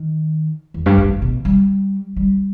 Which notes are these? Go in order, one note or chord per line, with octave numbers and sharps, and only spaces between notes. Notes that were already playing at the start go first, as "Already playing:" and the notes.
Already playing: D#3
E2
G2
G2
G#2
B2
G3
G3